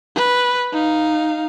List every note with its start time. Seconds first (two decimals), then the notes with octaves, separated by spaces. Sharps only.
0.15 B4
0.73 D#4 F5